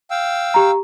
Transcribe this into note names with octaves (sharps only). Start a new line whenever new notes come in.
F5 G5 E6
G4 A#5